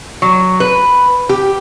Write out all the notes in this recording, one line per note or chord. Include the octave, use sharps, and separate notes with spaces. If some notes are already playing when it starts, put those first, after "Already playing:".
F#3
B4
G4